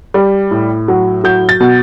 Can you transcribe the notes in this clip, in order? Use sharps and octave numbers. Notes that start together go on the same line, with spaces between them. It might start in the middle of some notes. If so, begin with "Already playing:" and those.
G3
A2
F#3
F#3 G6
A6
B2